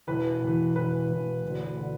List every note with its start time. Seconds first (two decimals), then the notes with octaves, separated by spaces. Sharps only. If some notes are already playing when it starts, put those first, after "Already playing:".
0.07 E1 E2 E3 B4
0.41 E1 E2 E3
0.75 E1 E2 E3 B4
1.09 E1 E2 E3
1.43 E1 D2 D3
1.77 D3